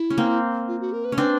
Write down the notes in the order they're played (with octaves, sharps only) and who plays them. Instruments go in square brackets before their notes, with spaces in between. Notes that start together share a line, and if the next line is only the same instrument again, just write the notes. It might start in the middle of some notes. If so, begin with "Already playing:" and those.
Already playing: [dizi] E4
[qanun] C#4
A#3 C4
[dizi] F4
F#4
A#4
B4
[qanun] C#4
[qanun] C4 D4 [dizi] B4